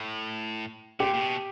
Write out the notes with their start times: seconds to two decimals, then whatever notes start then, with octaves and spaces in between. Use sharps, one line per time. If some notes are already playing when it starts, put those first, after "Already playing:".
Already playing: A2
1.00 A#2 G4
1.14 A#2
1.21 B2